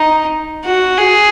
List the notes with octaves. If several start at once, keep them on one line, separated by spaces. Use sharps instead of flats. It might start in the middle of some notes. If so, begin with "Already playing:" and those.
Already playing: D#4
F#4
G#4